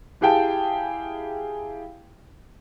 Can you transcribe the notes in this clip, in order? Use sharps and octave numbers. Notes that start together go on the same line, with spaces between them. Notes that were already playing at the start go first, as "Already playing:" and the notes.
E4 G4 G#4 F5 G5 A5